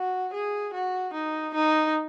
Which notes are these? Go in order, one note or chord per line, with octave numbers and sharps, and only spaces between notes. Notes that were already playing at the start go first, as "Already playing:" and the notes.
Already playing: F#4
G#4
F#4
D#4
D#4